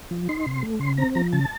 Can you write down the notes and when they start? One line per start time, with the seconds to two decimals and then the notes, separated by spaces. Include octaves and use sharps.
0.11 F3
0.29 D#4 C6
0.46 C3
0.62 A3
0.80 C#3 C6
0.97 C4 A#5
1.15 F3 A#5
1.33 C#3 A5